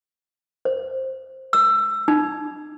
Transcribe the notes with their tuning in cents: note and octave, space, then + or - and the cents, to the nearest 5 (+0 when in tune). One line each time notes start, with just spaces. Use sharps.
C5 +10
E6 +20
D#4 -40